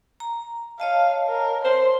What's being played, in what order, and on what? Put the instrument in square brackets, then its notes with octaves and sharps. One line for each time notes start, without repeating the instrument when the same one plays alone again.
[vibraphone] A#5
[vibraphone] C#5 D#5 A5 [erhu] F5
[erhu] A#4
[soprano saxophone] C5 [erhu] C6